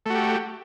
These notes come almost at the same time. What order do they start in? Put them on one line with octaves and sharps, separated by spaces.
A3 F#4 G4